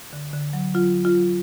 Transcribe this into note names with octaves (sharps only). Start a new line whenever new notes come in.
D3
D3
F#3
F#3 F4
F#3
F4
F#3